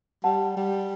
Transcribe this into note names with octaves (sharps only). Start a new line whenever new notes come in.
G3 F#5 A5
G3